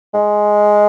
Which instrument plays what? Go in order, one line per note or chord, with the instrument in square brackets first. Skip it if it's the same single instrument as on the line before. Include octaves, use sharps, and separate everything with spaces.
[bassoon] G#3